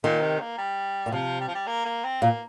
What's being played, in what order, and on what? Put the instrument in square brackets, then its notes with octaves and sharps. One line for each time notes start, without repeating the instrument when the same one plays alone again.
[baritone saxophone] A#2 [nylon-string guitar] D#3
[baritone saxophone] C3
A#3
G3
[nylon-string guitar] A#2
[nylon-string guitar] C3 [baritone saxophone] F3
[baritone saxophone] G3
F3
G3
A#3
A#3
C4
[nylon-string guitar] A#2 [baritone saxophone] A#3